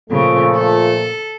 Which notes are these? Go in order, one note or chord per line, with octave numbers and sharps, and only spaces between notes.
A#2 C#3 F3 A3
A4